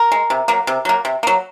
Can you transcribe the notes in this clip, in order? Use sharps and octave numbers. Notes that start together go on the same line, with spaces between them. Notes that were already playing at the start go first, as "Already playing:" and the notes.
Already playing: A#4
G#3
C3
F#3 A#3
C3
F#3 A#3
C3
F#3 A#3